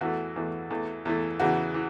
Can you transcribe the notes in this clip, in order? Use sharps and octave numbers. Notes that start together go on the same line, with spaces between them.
E2 E3 A3 F#4
E2 E3 A3
E2 E3 A3
E2 E3 A3
E2 C#3 E3 F#4
E3